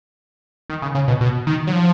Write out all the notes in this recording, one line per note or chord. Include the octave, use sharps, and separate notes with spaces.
D#3
C#3
C#3
B2
B2
D#3
F#3
F3